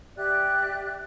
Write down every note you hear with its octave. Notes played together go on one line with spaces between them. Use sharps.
G4 D5 E5 F#6